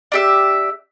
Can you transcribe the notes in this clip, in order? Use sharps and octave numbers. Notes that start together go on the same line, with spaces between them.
D4 G4 E5